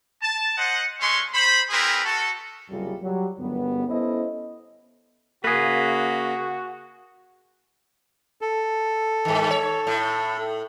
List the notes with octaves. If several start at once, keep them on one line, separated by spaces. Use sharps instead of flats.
A5
C5 D#5 F#5
G#3 A3 C#4 C6 C#6
C5 B5
C4 E4 G#4 A#4 B4
F#4 A4
F#1 C2 F#2 G3 F4 G#4
F#3 G3
G1 C#2 F#2 G3 B3
B3 C#4 E4 A4 C5 D#5
C#3 A#3 F#4 G#4 B4
A4
G2 D#3
C#5
A2